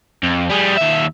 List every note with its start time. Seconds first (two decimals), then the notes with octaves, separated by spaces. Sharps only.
0.23 F2
0.49 G3 G#4
0.77 D#2 E5